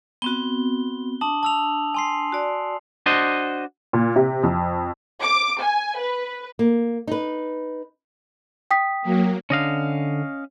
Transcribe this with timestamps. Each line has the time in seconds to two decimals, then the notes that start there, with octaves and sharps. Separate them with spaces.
0.22 B3 C4 F#4 G7
1.21 D4 A5 D#6 F#7
1.43 A5 E6 F7
1.94 G#5 C6 C7
2.33 F#4 D5
3.06 D4 F#4 C5 D#5
3.93 A#2
4.16 C3
4.43 F2
5.22 D6
5.62 G#5
5.98 B4
6.59 A#3
7.07 D#4 B4
8.71 G5 D#6 B6
9.02 F#3 A#3
9.50 D3 C#4 D#5 F5